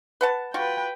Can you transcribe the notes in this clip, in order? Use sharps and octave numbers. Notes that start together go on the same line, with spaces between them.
B4 F#5 A5
F4 F#4 B4 G5